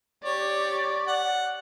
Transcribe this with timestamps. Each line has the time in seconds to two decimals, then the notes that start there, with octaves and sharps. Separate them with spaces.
0.24 G4 C#5 D5
1.07 F#5